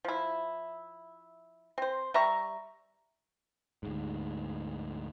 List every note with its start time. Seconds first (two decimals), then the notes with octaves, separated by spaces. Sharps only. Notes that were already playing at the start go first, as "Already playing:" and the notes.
0.05 F3 E4
1.78 C4 C5
2.14 G3 E5 A#5 C#6
3.83 D2 G#2